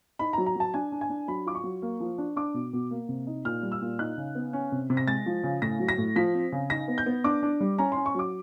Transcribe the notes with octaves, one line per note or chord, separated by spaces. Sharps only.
D#4 B5
A#5
F#3
A#5
F#3 A5
D4 G#5
D4
G#5
D4
F#3 B5
F4 D6
C#6
F#3
A#3
F3
D4
D4 D6
B2
B2
A#3
C3
D#4
A#2 F6
G3
E6
A#2
D#4 F#6
C#3
B3
C#4
C3
C3
A#6
G#3 A6
F3
C#3
A2 A#6
F#3
A#6
A2
F3 B6
C4
C#3
D#4 A#6
B3
G6
B3
D4 D6
D4
G3
C#4 A#5
C#4 C6
C#6
F#3 D6